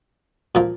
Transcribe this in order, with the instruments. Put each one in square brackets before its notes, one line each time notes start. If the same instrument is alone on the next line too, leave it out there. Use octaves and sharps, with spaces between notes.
[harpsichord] A#2 F3 A#3